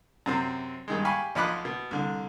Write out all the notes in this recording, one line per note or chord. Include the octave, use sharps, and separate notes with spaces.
F#2 C3 C4
G2 D#3 G#3
G4 F5 G#5 B5 C#6
B1 F3 D#5 B5 D6 F#6
B2
C2 D3